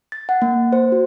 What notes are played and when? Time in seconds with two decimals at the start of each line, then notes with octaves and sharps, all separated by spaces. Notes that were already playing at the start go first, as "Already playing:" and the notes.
0.12 A6
0.29 F#5
0.42 A#3
0.72 C5
0.92 F#4